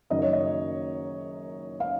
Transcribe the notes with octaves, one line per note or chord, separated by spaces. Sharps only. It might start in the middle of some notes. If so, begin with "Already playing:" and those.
F#1 F#2 D#3 F#3 D#5
C#5
D#5
F5